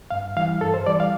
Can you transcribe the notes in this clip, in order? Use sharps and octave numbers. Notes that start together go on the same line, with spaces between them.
G2 F5
E3 G3 F5
G2 A4
C5
E3 G3 D5
F5